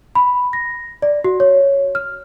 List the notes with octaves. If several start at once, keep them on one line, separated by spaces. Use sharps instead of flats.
B5
A#6
D5
F#4
C#5
F6